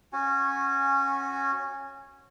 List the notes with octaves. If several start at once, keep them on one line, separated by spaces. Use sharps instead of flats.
C#4 F#4 G#5